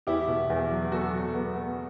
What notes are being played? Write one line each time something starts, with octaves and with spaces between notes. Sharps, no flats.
E2 E4 G4
B2
E2
F#3
B3 F#4 A4
F#3
B3
B3